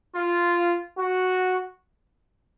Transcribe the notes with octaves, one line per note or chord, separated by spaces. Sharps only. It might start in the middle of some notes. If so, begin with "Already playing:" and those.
F4
F#4